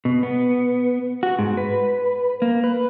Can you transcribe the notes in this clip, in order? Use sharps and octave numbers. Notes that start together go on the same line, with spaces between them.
B2
B3
F#4
G#2
B4
A#3
B4